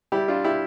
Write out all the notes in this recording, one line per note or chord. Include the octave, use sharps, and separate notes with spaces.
G3 E4 G4
D4 F4
E4 G4